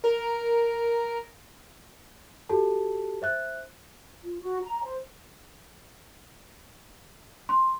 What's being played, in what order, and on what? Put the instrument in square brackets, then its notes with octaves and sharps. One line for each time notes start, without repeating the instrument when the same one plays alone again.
[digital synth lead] A#4
[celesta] F#4 G4 A4 A5
C5 E5 F#6
[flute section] F4
F#4
A#5
C5
[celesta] C6